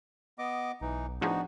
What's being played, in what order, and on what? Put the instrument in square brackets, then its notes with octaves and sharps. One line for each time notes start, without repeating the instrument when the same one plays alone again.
[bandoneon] B3 D#5 D6
[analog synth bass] B1 [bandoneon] E3 D#4
[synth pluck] A2 F3 G#4 [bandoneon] B3 D#4 F#4 [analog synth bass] D4